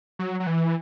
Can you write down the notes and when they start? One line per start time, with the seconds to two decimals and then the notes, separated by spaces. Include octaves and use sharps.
0.19 F#3
0.40 F#3
0.47 E3